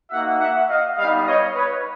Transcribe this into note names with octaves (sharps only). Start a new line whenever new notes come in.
A#3 D#4 F#4 E5 F#5
E5 F#5
D#5 F5
G3 B3 D#4 D#5 F5
C#5 D#5
B4 C#5